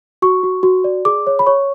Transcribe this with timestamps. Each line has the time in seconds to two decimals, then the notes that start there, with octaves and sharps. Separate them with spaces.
0.22 F#4 C#6
0.43 F#4
0.63 F#4
0.84 D5
1.05 G#4 D6
1.27 C#5
1.39 B5
1.46 C#5 C#6